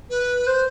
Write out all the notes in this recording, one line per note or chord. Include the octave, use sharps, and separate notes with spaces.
B4
C5